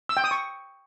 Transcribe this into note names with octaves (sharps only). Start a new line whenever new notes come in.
E6
G5
D#6
C#6